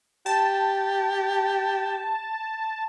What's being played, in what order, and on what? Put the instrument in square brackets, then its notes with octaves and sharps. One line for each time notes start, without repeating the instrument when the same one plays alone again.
[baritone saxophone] G4 [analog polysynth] A5